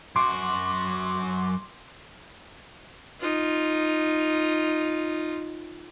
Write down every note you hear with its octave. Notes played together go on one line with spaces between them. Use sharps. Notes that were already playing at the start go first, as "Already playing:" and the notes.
F#2 F#4 C6 D6
D#4 F4